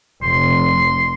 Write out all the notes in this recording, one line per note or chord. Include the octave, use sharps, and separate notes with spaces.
F1 C6